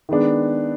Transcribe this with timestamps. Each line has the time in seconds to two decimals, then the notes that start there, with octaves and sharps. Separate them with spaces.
0.09 D#3 G#3 B3 D4